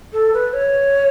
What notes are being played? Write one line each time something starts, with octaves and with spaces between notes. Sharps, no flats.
A4
B4
C#5